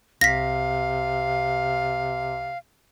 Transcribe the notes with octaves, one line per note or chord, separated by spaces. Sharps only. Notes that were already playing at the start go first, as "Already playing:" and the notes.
C2 C3 F5 A#6 B6